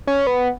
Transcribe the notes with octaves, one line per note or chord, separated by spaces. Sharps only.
C#4
B3